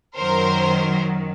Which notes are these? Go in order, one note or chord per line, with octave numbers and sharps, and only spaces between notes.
F#2 D#3 F#3 A#4 C5